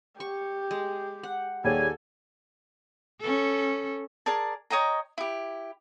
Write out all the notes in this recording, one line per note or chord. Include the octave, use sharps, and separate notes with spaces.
G4 C#6
G#3
F#5
D#2 G3 A#3 G#4 A4 C#5 G#5
C#4 A4
G#4 A#4 D5 A5
C#5 D#5 G5 A#5
E4 G4